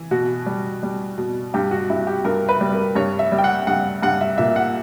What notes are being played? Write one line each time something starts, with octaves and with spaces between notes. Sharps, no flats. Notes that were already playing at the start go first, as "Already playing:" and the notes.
Already playing: E3
B2 F#4
G3
G3
B2
G2 G4
F#4
G2 E4
G4
G2 A#4
B4
G3
A#4
G2 C#5
E5
G3
G5
F#5
G2 F#5
G2 F#5
E5
A#2 E5
F#5